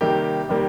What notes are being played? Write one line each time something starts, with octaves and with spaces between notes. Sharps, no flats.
C3 D#3 G3 A#3 G4
C3 D#3 G3 A#3